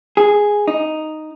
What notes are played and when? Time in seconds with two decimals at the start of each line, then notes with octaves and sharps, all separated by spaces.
0.17 G#4
0.68 D#4